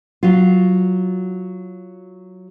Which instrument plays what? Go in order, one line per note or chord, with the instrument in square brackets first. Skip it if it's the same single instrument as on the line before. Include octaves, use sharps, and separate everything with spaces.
[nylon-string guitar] F#3 F4